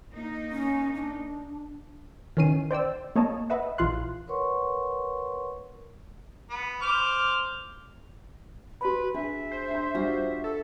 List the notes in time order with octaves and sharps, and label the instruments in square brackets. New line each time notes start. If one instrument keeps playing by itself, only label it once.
[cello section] A#3 D#4
[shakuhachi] C#4
D4
[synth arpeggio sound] D#3 E3 C#4 C7 D#7
C5 D5 G5 E6
A#3 C#5 D#5 A5
B4 D#5 E5 F#5
A#1 E3 F4 F5 C6 F#6
[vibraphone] A#4 B4 C#5 F#5 C6 C#6
[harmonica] B3
C5 D6 F6
[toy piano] F#4 B5 [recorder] B4
[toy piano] D4 [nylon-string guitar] G#4 [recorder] E5
[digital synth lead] C5
[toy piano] D4 C6
[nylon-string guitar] G3 F4 F#4 [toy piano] D4
[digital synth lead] A4